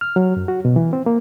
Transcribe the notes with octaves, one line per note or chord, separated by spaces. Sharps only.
F6
F#3
F#2
F#4
B2
E3
C4
A#3